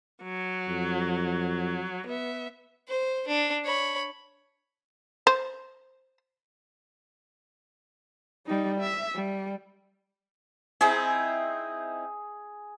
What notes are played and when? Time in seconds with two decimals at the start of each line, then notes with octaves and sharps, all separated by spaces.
0.24 F#3
0.68 F2
2.07 B3 E5
2.88 C5
3.28 D4
3.65 C#5 B5
5.27 C5
8.47 G3 D#4
8.81 E5
9.15 G3
10.81 C4 D#4 E4 G#4